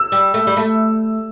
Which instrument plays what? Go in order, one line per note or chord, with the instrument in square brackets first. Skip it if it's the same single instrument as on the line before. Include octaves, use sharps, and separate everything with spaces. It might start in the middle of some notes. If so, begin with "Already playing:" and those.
Already playing: [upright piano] E6
[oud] G3
A3
G3
A3